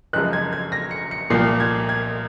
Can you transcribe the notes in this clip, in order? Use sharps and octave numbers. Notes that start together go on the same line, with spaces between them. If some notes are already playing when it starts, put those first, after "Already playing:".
F#1 F#2 F3 G#3 F#6
G#6
G#6
A#6
C#7
C#7
C2 A#2 F3 A#3 C7
G#6
G#6